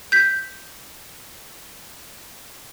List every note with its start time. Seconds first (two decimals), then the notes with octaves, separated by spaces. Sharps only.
0.12 G6 B6